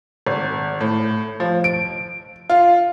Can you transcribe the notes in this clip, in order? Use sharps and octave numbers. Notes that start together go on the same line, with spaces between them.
G#1
A2
F3
D7
F4